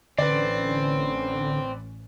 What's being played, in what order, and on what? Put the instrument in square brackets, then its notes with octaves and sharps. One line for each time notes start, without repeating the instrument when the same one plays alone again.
[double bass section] A1 E3 C#4 [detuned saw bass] D3 [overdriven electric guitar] C4 [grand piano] B4 D5